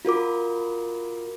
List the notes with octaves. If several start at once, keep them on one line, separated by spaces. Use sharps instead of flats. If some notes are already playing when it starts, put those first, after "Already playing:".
F4 F#4 A#4 D6